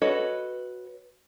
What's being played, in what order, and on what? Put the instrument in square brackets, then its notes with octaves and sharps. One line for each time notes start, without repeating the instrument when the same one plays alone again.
[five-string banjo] F#4 A4 B4 C#5 D#5